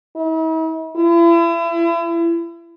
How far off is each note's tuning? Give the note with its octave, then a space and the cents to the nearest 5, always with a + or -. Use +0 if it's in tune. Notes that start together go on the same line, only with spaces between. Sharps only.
E4 -45
E4 +35